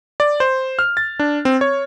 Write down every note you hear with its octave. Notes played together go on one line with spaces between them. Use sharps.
D5
C5
F6
A6
D4
C4
C#5